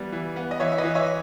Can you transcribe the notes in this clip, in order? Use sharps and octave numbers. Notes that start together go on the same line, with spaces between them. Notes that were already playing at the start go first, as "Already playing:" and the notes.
Already playing: E3 G3 B3
E3
B3
D#5
E3 C#5 E5
E5
B4 D#5
E3
C#5 E5